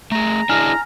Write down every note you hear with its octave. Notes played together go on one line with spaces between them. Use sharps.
A3 G#4 A#5
D4 E4 G#4 G#5 F6 A#6